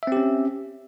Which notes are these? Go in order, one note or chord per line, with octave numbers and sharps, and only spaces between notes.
C4 C#4 G4 E5